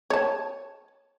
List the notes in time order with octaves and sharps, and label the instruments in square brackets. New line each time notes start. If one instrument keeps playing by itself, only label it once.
[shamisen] C#5 A5